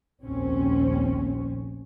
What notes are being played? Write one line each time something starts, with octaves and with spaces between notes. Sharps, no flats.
F1 A#1 D#2 A#2 C4 C#4